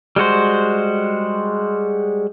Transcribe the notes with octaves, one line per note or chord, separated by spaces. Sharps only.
G3 G#3 F#4 C5